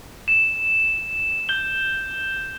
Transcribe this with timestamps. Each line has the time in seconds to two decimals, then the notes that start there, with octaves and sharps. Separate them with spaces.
0.28 E7
1.49 G6 G7